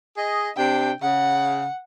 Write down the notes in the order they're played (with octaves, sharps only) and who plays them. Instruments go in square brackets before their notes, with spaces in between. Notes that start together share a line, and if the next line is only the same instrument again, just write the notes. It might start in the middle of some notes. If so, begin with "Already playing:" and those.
[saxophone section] G#4 D#5
[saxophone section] C3 D4 [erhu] G5
[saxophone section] C#3 [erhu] F#5